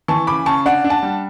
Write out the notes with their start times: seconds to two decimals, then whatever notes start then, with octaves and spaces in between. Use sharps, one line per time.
0.08 E3 A5 C#6
0.27 C#3 B5 D6
0.46 C#3 A5 C#6
0.66 D4 D5 F#5
0.84 D4
0.90 F#5 A5
1.03 G3